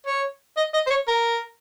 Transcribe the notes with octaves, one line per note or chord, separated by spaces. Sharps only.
C#5
D#5
D#5
C5
C#5
A#4